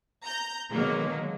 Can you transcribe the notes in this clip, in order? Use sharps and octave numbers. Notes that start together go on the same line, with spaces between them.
A#5 G6
B2 D3 D#3 F#3 G#3 A#3